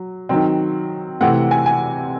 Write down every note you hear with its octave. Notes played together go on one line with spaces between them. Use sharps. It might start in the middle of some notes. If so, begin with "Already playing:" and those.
Already playing: F#3
D#3 F#3 C4
C3 E3 A3 C4 F#5
G#5
G#5